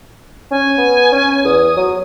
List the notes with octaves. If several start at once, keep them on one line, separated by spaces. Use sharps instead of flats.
C#4 G#5
B3
C#4
E2 D#6
F#3